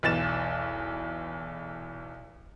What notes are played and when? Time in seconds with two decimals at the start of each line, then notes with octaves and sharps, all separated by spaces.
0.03 B1 E2 A6 E7